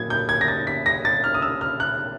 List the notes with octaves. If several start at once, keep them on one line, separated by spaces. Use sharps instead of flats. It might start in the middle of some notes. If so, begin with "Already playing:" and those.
Already playing: A#2 F#3 A#3 G#6
G6
G#6
A#6
A6
B6
A#6
A6
F6
D#6
E6
F6
F#6